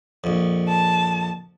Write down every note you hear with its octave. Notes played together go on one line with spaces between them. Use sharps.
A#1 F2
A5